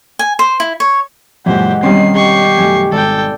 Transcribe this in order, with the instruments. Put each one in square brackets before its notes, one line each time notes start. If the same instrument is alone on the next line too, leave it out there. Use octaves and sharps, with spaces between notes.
[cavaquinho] G#5
C5
E4
C#5
[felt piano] F#2 A#2 [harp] E3 G#3 [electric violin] G4 C5 [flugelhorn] F#5
[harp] B2 D#3 G3 [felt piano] C4 C#4 C6 [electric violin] C7
[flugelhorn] G4 [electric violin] C#6 C7
[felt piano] F#2 A3 [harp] G#5
[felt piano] G#1 [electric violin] A4 G5 [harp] D5